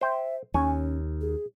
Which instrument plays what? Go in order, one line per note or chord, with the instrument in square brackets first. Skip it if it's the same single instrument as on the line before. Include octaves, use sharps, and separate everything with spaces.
[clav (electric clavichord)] C5 G5 [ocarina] E5
[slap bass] D#2 [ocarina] C#4 [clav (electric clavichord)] C#5 G#5
[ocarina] G#4